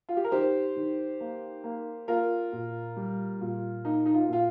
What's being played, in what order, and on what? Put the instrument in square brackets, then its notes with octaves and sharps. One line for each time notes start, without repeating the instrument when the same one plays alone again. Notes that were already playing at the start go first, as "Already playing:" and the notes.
[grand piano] F4
G4
A#4
D#3 G4 C5
D#3
A#3
A#3
A#3 F4 A#4
A#2
G3
A#2
A#3 D#4
D#4
F4
A#2 F4